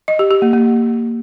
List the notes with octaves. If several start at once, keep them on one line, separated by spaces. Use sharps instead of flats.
D#5
G4
G4
A#3
A#3